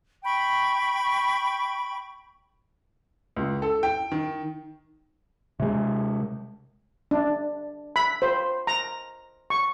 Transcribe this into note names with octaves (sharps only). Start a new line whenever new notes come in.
G5 B5 C#6
C#2
A4
G5
D#3
C3 G#3
D4
B5
C5
A#5
C#6